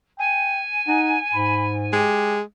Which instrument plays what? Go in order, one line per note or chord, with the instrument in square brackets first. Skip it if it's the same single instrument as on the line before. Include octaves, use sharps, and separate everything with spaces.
[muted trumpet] G5 [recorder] G#5
[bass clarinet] D#4 [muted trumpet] F#5
[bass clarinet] G#2 [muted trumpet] B5
[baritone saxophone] G#3 [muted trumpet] G4